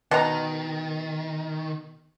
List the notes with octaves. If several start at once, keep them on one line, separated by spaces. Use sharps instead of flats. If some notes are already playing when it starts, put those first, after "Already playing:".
B2 D#3 A#5